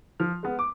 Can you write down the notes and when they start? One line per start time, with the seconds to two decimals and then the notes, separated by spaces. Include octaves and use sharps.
0.20 F3 F6
0.43 G#3 B3
0.59 D6